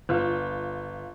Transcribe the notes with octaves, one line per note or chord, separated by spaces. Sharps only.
G1 F4